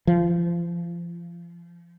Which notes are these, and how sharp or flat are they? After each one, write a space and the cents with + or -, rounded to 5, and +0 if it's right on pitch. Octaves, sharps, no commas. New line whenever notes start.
F3 -30